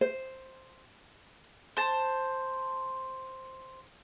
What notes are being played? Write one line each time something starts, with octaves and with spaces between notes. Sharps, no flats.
C5
C5 A5